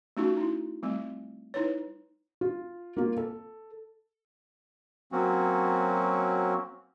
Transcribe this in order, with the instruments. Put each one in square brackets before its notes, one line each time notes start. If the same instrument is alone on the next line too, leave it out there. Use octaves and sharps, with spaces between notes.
[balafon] A3 C#4 D#4 F4 F#4
D#4 E4
G3 A3 C4
D#4 E4 B4 C#5
[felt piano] F4
A#3 F4
A4
[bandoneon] F#3 A#3 C4 C#4 F#4